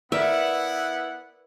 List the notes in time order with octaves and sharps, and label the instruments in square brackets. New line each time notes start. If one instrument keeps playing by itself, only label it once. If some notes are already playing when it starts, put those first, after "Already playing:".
[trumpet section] B3 E4 F#5 [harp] A#4 D5 [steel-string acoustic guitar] B4 [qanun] E5